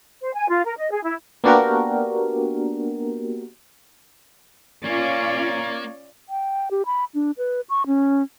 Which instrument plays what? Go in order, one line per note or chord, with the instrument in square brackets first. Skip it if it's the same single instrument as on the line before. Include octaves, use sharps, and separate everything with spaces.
[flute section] C5
G#5
F4
A#4
D#5
G#4
E4
[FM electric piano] A#3 B3 D4 F#4 G4 A#4
[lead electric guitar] A#3 [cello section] C#4 F4 [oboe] C#5 [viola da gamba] D5
[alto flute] G5
G4
B5
D4
B4
C#6
C#4